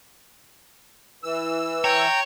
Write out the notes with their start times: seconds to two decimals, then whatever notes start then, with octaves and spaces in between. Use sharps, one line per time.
1.24 E3 E6
1.84 C#5 G5 A#5